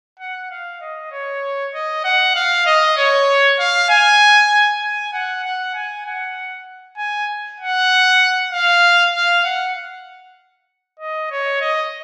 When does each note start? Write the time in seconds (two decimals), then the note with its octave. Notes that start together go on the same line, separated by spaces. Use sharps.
0.19 F#5
0.50 F5
0.81 D#5
1.12 C#5
1.74 D#5
2.05 F#5
2.36 F5
2.66 D#5
2.97 C#5
3.59 F5
3.90 G#5
4.82 G#5
5.13 F#5
5.44 F#5
5.75 G#5
6.06 F#5
6.98 G#5
7.60 F#5
8.53 F5
9.14 F5
9.45 F#5
11.00 D#5
11.31 C#5
11.61 D#5